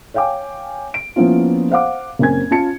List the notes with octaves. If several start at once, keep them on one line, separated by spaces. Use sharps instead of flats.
C#5 F5 G5 G#5 D6
D7
F3 A#3 B3 C#4 E4 F4
C5 F5 F#5 D6
F#1 C4 C#4 A#4 G#5 G#6
C#4 F4 A5 C#7